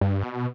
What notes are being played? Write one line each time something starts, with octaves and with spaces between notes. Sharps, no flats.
G2
B2